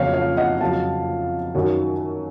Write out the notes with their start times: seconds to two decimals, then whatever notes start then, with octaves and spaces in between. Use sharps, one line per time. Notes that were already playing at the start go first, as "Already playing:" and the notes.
Already playing: F2 C#3 F#3 C#5 F5
0.14 C#5 F5
0.37 D#5 F#5
0.61 F2 C#3 F#3 F5 A5
1.55 F#2 D#3 F#3